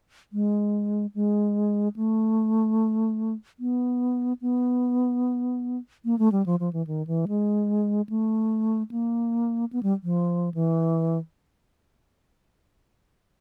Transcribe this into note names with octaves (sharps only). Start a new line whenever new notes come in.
G#3
G#3
A3
B3
B3
A#3
A3
G3
F3
F3
E3
D#3
E3
G#3
A3
A#3
B3
G3
F3
E3